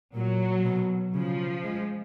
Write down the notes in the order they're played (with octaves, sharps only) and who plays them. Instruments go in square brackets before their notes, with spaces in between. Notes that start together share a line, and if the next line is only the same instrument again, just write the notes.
[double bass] A#2 [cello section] F#3
[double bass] B2
[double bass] C#3 [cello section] F3
[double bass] G#3